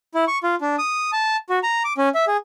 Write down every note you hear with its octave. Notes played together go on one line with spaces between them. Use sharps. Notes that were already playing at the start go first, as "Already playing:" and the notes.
E4
C#6
F4
D4
D#6
A5
F#4
A#5
D6
C#4
E5
G#4